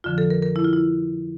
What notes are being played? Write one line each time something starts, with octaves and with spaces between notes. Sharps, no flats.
F2 D3 F3 F4
A4
A#4
A#4
E4
F4
E4